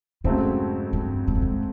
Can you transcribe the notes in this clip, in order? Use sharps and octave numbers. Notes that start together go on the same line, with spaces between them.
F2 G#2 C#3 F#3 A3 C4
G2
G#2
G2
G#2